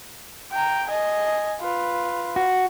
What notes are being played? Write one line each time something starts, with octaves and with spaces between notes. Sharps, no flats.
G5 A#5
D#5 G#5
F4 B4
F#4